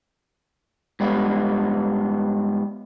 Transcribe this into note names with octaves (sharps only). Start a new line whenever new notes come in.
G#2 G3 B3